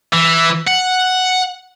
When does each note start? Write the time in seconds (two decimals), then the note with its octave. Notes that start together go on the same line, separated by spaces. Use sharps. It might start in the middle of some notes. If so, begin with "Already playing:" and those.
0.13 E3
0.67 F#5